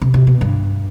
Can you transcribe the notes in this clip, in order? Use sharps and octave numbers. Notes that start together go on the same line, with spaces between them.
C3
C3
B2
G2